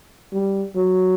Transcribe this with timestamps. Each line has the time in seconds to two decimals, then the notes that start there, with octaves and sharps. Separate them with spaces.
0.33 G3
0.75 F#3